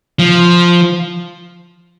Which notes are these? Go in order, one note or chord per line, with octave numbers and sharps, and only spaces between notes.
F3